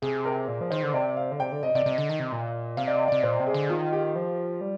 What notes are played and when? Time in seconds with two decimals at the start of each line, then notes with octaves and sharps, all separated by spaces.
0.02 C3 G#4
0.25 A#4
0.48 A#2
0.61 F3
0.71 D#3 C5
0.83 D3
0.94 C3 D5
1.17 F5
1.31 D3
1.40 C3 G5
1.52 D3
1.63 C3 D#5
1.75 C3 D5
1.86 C3 D#5
1.98 D3
2.09 D#3
2.20 C3
2.32 A#2
2.77 C3 F5
2.88 D5
2.93 D#5
3.08 C3 D5
3.23 A#2 C5
3.39 C3
3.47 G#4
3.54 D3
3.69 D#3 F4
3.93 G4
4.15 F3
4.61 G3